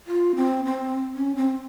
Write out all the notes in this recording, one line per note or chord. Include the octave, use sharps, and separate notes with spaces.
F4
C4
C4
C#4
C4